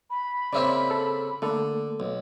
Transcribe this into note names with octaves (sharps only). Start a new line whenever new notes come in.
B5
C#3 A#3 C4 D5 E5
A4 E6
D3 A3 A#3 A4
B1